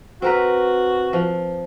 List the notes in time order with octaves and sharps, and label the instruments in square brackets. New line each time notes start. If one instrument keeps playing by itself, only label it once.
[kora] C4 A#4 B4 [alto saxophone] F#4
[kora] F3